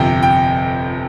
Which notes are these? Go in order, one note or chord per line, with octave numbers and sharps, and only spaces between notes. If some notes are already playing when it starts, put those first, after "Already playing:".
Already playing: G1 F2 C3 G5
G5